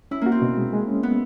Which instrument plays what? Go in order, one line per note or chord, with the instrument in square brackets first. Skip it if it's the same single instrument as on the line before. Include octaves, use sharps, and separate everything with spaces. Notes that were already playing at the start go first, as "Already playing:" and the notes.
[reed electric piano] C#4 [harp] E4
[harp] A#3 [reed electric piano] F#4
[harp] C4
[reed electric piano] B2
G#3
G#3
C#4
[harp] B3